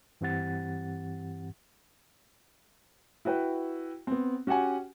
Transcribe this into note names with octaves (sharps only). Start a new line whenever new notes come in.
G2 E3 C4 G4 F#5 A6
E4 F#4 B4 G5
B3 C4
C#4 F#4 G4 F#5 G#5